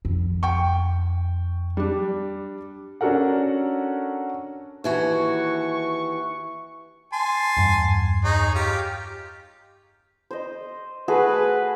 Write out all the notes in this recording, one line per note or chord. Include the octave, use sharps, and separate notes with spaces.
F2
G5 C#6
G3 D4
C#4 D4 F#4 A4 A#4 F#5
D#2 E3 F#4 C#6
G#5 A5 C6
E2 G2
D#4 G#4 C#5
F4 G4
C5 D#5
A3 F#4 G#4 B4